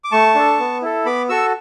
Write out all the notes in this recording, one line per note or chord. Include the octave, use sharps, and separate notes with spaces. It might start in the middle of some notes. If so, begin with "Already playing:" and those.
D6
A3 A5 C#6
D4 A4
B3
E4 A4
B3 B5 D6
F#4 A4 C#6 E6